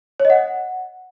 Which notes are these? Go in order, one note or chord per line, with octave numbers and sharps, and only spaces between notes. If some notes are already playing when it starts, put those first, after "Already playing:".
C#5
D#5
F#5